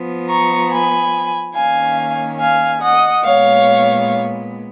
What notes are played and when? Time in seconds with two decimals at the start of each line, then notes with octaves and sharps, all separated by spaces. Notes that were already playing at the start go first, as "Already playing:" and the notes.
Already playing: F3 B3
0.28 A#5 C#6
0.70 G#5 B5
1.55 D#3 A#3 C#4 F5 G#5
2.39 F5 G#5
2.81 D#5 F#5
3.24 A#2 G#3 B3 C#5 F5